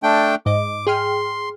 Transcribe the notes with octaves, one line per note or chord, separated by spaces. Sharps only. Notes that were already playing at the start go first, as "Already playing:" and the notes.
A3 D4 G5
G#2 D#5 D6
G#4 G5 C6 F6